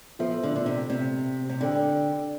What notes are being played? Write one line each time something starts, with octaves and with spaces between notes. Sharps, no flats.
F3 B3 F4 A4 E5
D3
D3
C3
C3
C3
D3 D4 A4 D5 G5